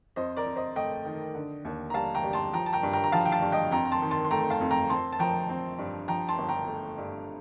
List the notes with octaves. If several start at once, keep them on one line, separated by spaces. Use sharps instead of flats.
F2 C5 D#5
A#4 D5
F2
C5 D#5
A3 D#5 G5
D#3
D3
D#2
A#5
G3 F5 A5
G5 A#5
G3
A5 C6
F3 G5 A#5
A5
G5 A#5
G2
G5 A#5
A#5
F3 F5 A5
G5
F5 A5
G2
D#5 G5
F2 G5 A#5
A#5
A5 C6
D#3
A5 C6
C6
A3 G5 A#5
F5 A5
F2
G5 A#5
C4 A5 C6
A5
F3 G5 A#5
C4
G2
F3 G5 A#5
A5 C6
G1
G5 A#5
A3
G2